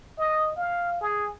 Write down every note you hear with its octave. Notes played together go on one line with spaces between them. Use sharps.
D#5
F5
G#4